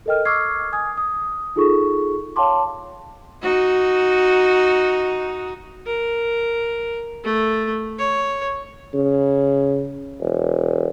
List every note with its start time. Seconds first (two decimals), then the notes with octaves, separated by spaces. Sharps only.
0.06 A4 A#4 D#5 G5 F6
0.25 C#6 D6 E6 F6 G#6 C7
0.73 G#5 D#6 G#6
0.98 D#6
1.56 D#4 F4 G#4 A4 C#6
2.36 C#5 F5 G5 A5 C6 D6
3.42 D#4 F#4
5.86 A#4
7.24 A3
7.99 C#5
8.94 C#3
10.20 E1